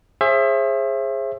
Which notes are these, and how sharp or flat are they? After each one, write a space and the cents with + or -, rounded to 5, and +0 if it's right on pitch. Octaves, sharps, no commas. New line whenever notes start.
G#4 +0 C5 +40 E5 +20